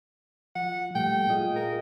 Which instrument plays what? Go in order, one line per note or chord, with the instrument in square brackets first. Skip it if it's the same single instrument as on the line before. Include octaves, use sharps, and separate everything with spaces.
[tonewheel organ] F3 [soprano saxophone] F#5
[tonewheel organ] A#2 G3 A3 [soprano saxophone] G5
[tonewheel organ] F4 G#4 D#5
[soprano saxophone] A#4